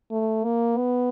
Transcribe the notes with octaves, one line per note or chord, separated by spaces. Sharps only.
A3
A#3
B3